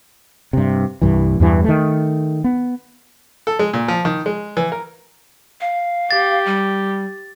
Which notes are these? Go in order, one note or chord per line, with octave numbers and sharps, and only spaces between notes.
G2 C3
C2 G2 E3
E2 G2 E3
D#3 A3
B3
A4
G#3
A#2
F3
D#3
G#3
E3
A#4
F5
G4 A6
G3